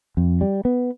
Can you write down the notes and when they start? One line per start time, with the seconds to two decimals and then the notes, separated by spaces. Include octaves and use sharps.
0.17 F2
0.41 G3
0.65 B3